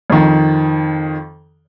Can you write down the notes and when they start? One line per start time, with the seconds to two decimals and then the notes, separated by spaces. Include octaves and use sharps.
0.10 F2 D#3